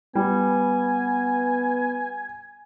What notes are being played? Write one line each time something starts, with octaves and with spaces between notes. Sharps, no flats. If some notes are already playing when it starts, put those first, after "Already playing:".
G3 B3 G#5